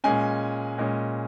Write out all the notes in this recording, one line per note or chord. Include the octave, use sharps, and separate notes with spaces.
A#2 G#3 C#4 G#5
A#2 G#3 C#4